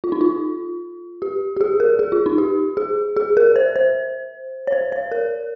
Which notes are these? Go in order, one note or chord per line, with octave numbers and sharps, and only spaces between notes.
F4
D#4
F4
G4
G4
G#4
A#4
G#4
F4
D#4
G4
G#4
G#4
A#4
C5
C5
C#5
C5
C#5
A#4